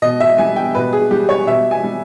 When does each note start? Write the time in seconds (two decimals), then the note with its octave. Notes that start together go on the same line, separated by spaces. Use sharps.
0.02 B2 D#5
0.20 E5
0.38 G3 G#5
0.56 G5
0.75 B2 B4
0.93 G#4
1.11 G3 G4
1.29 C#5
1.47 B2 E5
1.71 G#5
1.83 G3